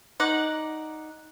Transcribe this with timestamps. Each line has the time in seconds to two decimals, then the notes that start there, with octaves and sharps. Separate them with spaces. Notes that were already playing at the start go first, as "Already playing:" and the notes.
0.20 D#4 D5 F#5